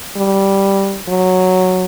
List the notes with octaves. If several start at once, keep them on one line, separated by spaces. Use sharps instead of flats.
G3
F#3